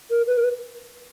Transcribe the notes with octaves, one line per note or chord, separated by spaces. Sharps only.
A#4
B4
A#4
B4